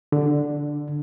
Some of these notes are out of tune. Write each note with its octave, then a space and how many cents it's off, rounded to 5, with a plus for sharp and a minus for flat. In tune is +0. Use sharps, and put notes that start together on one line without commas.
D3 +0 D4 +20